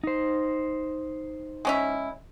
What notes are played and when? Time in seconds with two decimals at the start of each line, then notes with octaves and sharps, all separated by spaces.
0.04 D#4 C5
1.65 G#3 C#4 E4